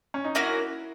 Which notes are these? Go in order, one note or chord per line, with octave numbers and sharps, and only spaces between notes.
C#4
D#4
A#3 C#4 E4 F#4 A#4